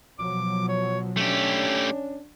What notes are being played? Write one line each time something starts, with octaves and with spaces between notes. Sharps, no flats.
B2 F3 F#3 D6
C#5
A3 C#4 D4 G4